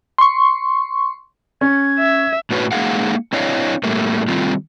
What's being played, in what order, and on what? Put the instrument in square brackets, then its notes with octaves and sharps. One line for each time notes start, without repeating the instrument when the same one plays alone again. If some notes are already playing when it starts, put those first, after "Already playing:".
[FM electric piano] C6 C#6
[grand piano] C#4 [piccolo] G#6
[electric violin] E5
[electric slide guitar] A2 D4 F#4 B4 C#5
G#3 A#3 D#4 G#4 F5 F#5
C4 D4 E4 C#5 D#5 F5
A2 G3 A3 A#3
D#3 G3 A3 C4 F4